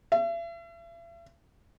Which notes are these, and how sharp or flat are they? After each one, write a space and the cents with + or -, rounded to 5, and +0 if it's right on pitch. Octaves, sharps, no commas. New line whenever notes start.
E5 +40